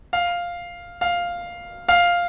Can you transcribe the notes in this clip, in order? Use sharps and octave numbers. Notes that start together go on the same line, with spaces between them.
F5
F5
F5